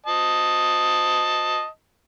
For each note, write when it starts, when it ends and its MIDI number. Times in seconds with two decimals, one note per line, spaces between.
0.06 1.66 75
0.06 1.66 81